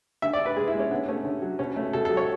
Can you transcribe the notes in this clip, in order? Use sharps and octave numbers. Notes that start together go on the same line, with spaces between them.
D3 E5
D5
D3
B4
G#3 G#4
E4
G#3 C#4
D3 B3
A3 C#4
D3
F#3
B2 C#4
A3
B2 A4
A4
F#3
C#5